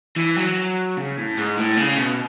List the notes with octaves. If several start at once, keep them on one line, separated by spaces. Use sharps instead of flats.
E3
F#3
C#3
A2
G#2
A2
C#3
B2